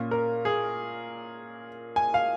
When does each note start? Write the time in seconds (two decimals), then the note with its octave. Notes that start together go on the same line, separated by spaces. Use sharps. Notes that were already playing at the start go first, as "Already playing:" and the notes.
Already playing: A#2 A#3 C#4
0.11 A#4
0.45 G#4
1.96 G#5
2.14 F5